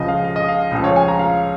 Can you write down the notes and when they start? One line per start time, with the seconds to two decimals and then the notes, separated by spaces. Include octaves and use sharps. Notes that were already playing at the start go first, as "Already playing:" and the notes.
Already playing: C#2 C#3 F3 D#5
0.08 F5
0.24 F5
0.36 D#5
0.48 F5
0.71 C#2 C#3 F3
0.84 C#5
0.96 G#5
1.08 A#5
1.19 F5